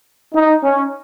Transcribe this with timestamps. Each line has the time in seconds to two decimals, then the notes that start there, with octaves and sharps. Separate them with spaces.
0.34 D#4
0.63 C#4